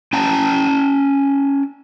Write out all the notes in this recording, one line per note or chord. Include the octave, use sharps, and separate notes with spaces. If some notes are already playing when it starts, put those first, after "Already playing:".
C#4 G5 A5 A#5